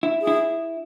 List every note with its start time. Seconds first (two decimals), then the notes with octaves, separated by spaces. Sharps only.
0.03 E4
0.21 G#4
0.27 E4